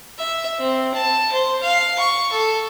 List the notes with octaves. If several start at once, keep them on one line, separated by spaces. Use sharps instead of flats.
E5
C4
A5
C5
F5
C#6
A4